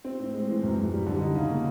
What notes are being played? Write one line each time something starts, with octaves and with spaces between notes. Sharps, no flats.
C4
A2
G#3
E3
F#2
F#2
G3
D3
D#4
C#3
A#3